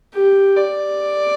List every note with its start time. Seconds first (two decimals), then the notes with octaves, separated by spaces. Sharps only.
0.14 G4
0.57 D5